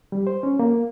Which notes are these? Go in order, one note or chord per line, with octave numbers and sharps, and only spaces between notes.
G3
C5
C#4
A#3